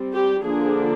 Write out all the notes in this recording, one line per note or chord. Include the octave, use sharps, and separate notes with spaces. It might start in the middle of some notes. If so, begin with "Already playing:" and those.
Already playing: G3 C4
G4
D3 F3 A#3 D4 G#4